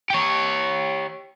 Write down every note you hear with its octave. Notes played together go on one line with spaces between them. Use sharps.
G4 C#5